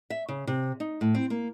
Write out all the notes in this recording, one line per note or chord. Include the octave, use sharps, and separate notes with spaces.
E5
C#3
C3
D#4
A2
C4
A#3